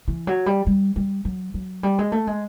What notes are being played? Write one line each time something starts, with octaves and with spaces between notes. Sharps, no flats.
E3
F#3
G3
G3
G3
F#3
F#3
G3
G#3
A3
G#3